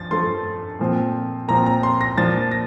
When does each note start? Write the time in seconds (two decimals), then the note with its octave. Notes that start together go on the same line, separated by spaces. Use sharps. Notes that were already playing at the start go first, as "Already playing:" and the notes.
Already playing: G2 F3 A6
0.11 G2 F3 A3 C6
0.79 A#2 F3 C4
1.48 A#2 F3 C4 A#5
1.66 A#5
1.83 C6
2.01 A#6
2.18 A#2 F3 A#3 D4 F4 A6
2.52 A#6